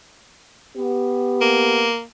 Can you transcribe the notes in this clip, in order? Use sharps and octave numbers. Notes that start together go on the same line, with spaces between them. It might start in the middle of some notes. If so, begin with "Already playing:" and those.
B3 G4
A#3